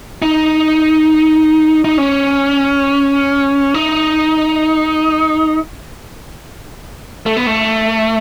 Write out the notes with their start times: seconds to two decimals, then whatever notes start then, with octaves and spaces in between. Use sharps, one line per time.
0.22 D#4
1.85 D#4
1.98 C#4
3.74 D#4
7.26 A3
7.37 B3
7.47 A3